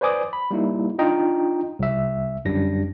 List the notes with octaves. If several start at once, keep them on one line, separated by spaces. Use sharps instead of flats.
B4 C5 D5 G#5 D6 D#6
B5
G3 A#3 D#4 E4
D4 D#4 F4 D#5 G5 A#5
C2 E5
G1 F#2 G3 D4 A#6